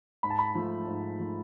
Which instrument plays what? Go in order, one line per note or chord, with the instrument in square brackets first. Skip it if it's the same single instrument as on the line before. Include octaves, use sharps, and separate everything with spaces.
[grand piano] G#2 B5
A5
B5
F3 A3
G#2
F3 A3